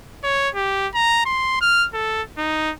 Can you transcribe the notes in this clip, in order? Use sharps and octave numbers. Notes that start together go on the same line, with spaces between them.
C#5
G4
A#5
C6
F6
A4
D#4